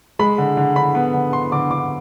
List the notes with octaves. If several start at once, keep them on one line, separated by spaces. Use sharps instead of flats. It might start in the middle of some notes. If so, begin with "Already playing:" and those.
G#3 B5
D3
D3
D3 B5
B3
D3
D3 C6
D3 D6
D3 D6